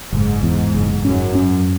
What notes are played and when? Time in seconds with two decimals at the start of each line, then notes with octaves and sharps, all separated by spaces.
0.13 F#1 G#2
0.43 E2
0.75 F#1
1.05 F#2 C#4
1.35 C#4